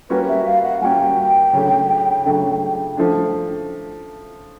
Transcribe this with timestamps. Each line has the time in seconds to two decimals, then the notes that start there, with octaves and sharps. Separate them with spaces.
0.10 G3 A#3 C#4 F#4 B4
0.28 E5
0.46 F5
0.64 F#5
0.82 G3 A#3 C#4 F#4 G5 G#5
1.53 C#3 F#3 A3 D4
2.25 C#3 F#3 A3 D4
2.97 F3 A3 D4